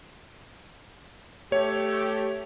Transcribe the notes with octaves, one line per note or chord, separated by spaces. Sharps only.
A3 G4 C#5